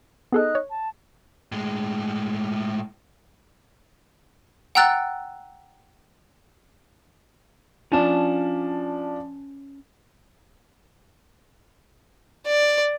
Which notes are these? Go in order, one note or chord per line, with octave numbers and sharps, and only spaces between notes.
B3 D#4 G#4 A4 F#6
C#5
A5
A2 G#3
F#5 G5 A#5 E6 F#6 A6
F3 C#4 D4 A5
D5